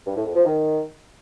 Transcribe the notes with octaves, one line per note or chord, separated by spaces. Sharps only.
G2
A2
F2
F3
D#3